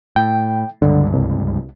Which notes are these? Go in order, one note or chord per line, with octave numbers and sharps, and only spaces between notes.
A2 G5
C#2 G2 D3
C2